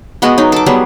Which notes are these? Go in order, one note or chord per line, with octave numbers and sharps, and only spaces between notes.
G#3 B3 F#4 D#5
F#3 D#4
A4 D6
F#3 G3 B3 G#4